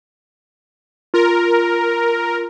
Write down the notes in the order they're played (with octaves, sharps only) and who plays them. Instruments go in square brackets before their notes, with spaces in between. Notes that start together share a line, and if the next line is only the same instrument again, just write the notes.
[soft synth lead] F4 [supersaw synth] A#4